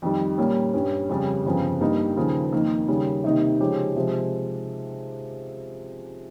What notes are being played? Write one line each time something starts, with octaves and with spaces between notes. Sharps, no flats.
F2 D#3 G3
A#2 G3 A#3 C#4
G2 G3 C#4
F2 C#3 G3 C#4
G1 F2 C#3 F3
G2 G3 A#3 D#4
D#2 C#3 F3
F2 D#3 A#3
D#2 C#3 G3 C#4
C3 D#3 A#3 D#4
C#3 F3 G#3 C#4 G4
C3 F3 G#3